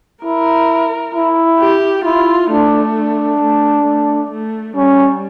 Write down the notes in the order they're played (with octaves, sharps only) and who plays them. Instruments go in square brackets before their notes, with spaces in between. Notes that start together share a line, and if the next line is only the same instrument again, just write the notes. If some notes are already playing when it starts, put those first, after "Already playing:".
[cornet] E4 [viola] A#4
[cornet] E4
[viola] G4
[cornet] E4 [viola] F4
[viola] A3 [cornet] D4
[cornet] D4
[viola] A3
A3
A3
[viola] G3 [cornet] C#4